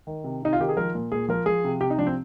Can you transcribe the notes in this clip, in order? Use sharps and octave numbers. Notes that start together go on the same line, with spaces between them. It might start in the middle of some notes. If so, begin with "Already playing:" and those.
D#3
C3
C3 D#4
F4
D#3 G4
G#4
F3 A#4
A#2
A#2 G#4
F3 A#4
F3 G#4
C3
C3 G4
D#4
F3 D4
C4